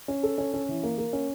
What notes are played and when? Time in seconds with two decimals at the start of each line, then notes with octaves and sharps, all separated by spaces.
0.08 C#4
0.23 A4
0.38 C#4
0.54 C#4
0.69 E3
0.83 A#3
0.98 A#3
1.13 C#4